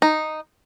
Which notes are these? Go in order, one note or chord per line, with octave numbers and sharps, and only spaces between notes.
D#4